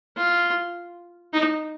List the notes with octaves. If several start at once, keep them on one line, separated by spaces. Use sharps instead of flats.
F4
D#4